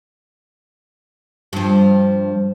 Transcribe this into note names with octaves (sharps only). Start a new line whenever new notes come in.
G2 F3